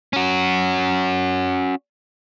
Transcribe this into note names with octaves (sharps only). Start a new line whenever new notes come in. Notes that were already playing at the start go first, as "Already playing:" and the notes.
C#4 F#4